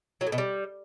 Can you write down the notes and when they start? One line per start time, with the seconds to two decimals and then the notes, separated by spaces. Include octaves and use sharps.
0.21 F#3
0.27 A2
0.32 B2
0.38 G3